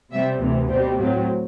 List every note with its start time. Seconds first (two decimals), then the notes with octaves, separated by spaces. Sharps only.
0.12 C3 G3 C4 E5
0.40 D2 C3 E3
0.69 B2 G3 C4
0.98 A2 F#3 C4